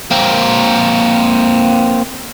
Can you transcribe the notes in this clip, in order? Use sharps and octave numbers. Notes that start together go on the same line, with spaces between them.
A#3 C4